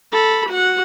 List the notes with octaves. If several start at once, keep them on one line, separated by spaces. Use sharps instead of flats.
A4 B5
F#4 F#5